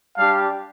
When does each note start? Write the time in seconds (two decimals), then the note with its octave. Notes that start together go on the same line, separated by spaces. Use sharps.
0.18 G3 D4 G4 F5 A5